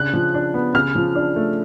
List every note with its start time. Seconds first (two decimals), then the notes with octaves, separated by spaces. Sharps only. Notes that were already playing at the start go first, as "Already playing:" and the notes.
Already playing: C#3 D4 F#6
0.13 F3
0.34 D4
0.54 B3
0.74 C#3 F6
0.95 F3
1.15 D4
1.36 A3